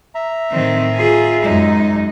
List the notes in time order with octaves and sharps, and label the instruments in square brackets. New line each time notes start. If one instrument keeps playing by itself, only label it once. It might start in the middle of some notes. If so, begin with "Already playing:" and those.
[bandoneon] E5 A#5
[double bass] A2 [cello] D#3 C4
[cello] F4 G#4
[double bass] F#2 G#3 [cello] D#4